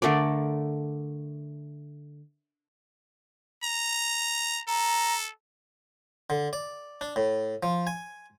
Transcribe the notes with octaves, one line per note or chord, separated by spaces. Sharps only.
D3 A3 A#4 D5
A#5
A4 A#5
D3
D5
D4
A2
F3
G#5